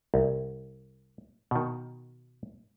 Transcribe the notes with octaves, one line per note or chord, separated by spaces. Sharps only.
C2
B2 D#3